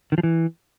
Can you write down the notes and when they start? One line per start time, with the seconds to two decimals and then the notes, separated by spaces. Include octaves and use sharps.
0.12 D#3
0.18 F3
0.23 E3